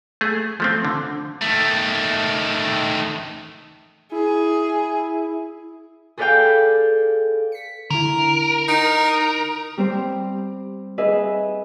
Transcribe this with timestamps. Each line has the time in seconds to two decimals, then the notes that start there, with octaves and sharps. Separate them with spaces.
0.21 A3 G#4
0.60 F3 A3 C4
0.85 D3
1.42 D#3 A3
4.12 E4 G#4
6.18 G#4 A4 B4 D5 F5 G5
7.52 B6 C#7
7.90 D3 E4 A#4
8.69 D#4
9.77 G3 C4 G4 C5
10.98 G#4 B4 D#5 E5